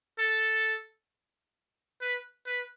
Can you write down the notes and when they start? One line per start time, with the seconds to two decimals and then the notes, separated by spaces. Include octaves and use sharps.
0.19 A4
2.01 B4
2.46 B4